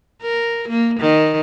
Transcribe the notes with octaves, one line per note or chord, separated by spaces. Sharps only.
A#4
A#3
D#3